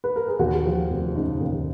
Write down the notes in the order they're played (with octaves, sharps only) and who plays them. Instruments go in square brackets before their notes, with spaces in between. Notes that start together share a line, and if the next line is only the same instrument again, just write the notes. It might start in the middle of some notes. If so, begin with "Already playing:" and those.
[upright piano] B4
A#4
G#4
D#2 F#4
F3
F1
C#3 D#4
D#2